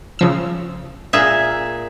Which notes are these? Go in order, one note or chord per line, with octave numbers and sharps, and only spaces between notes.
C#3 F3 E6
A#2 G#4 E5